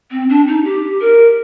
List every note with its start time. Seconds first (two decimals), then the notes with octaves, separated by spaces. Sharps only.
0.12 C4
0.29 D4
0.47 D#4
0.65 G4
1.01 A#4